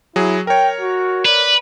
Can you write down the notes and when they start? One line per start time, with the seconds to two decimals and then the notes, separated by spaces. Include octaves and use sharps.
0.16 F#3 E4 G#4
0.47 A#4 C#5 G5
0.80 F#4
1.26 B4 D5